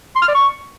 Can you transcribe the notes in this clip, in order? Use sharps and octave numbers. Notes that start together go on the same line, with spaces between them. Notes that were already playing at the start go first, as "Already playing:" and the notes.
C6
F6
D5
C#6